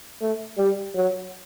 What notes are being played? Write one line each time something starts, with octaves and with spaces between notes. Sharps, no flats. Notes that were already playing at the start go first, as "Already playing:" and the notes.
A3
G3
F#3